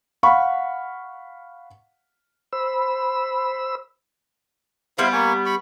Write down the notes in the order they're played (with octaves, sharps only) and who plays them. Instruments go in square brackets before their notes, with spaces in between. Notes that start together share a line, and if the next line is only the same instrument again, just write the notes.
[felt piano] F5 F#5 B5 C#6
[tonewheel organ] C5 B5 E6
[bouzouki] G3 B3 [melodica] E4 C5 F5
[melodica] A#3 G#5 C#6
B5 C#6